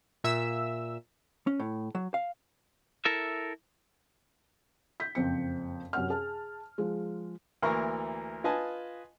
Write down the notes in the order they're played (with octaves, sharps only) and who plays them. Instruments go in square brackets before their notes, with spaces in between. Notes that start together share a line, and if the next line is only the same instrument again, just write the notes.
[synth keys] A#2 E5 E6
[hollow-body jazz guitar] C#4
A2
F#3
F5
[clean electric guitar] E4 A4 A#4 E5
[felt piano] G6 B6
F#1 F2 C4 C#7
F#2 C3 C#4 F#5 F6
G#4 A5
F3 G#3
[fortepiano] D2 E3 A#3 A#4 A#5 C#6
F4 B4 D#5 G#5 A5